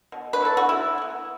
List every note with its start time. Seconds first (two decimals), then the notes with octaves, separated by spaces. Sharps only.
0.12 B2
0.33 B4
0.40 A3 E4 A4
0.57 F#4
0.69 E3 E4
0.98 B3 E4